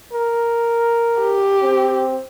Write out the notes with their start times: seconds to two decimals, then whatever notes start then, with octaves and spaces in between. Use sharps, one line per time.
0.13 A#4
1.20 G4
1.63 C4